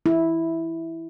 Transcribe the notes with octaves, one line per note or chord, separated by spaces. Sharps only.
E4